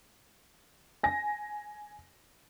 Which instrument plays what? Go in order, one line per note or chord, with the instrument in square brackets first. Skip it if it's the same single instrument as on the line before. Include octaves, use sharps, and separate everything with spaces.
[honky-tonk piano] G#5 A#6